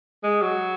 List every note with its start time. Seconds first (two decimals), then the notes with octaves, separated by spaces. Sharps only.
0.24 G#3
0.42 F#3